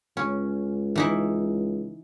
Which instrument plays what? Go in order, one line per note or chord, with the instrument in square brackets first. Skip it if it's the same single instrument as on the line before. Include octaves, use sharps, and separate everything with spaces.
[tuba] C#2 [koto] C#4
[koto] E3 D#4 E4